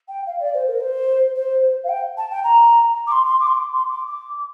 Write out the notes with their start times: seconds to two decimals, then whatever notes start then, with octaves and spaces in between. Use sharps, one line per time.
0.08 G5
0.27 F5
0.40 D5
0.54 C5
0.68 A#4
0.80 C5
1.36 C5
1.84 F5
1.89 G5
2.17 A5
2.30 G5
2.44 A#5
3.07 D6
3.12 C6
3.25 C6
3.40 D6
3.47 C6
3.53 D6
3.71 C6
3.89 D6
4.07 D6